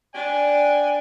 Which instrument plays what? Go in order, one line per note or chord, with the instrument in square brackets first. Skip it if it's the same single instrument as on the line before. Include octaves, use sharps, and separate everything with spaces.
[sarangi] D4 [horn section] D5 G5 G#5